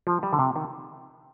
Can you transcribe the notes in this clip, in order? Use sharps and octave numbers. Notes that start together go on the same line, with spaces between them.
F3
G3
D3
C3
D#3